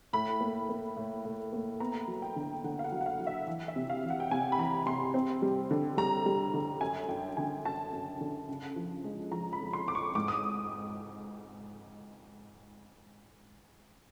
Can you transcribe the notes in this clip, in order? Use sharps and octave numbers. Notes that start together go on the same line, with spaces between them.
A2 B5
A#3
A#3
A2
A2
A#3
B3 A#5
F#3
G5
D3
D3 F#5
F5
F#5
F#3
F#5
F5
F#3
E5
E3
E5
C3
F5
E3
F#5
G5
C3 G#5
B5
E3 A#5
C3 C6
C4
G3
D3
G3 A#5
G3
D3
F#2 G#5
F#2 G5
D3 G#5
F#2 A5
F#2
D3
C#3
F3
G#3
F3 A#5
B5
F2
C6
F2 D6
C#6
G#2 D6
D#6